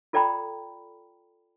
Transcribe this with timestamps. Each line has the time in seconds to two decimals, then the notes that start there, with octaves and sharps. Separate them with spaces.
0.13 F4 A4 D5 G5 A#5 B5